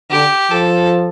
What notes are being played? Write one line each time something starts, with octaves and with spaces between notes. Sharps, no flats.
D3 G4
F3 A4